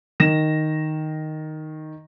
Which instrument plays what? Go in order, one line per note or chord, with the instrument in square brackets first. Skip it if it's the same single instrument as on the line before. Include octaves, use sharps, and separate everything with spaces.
[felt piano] D#3 A#6 E7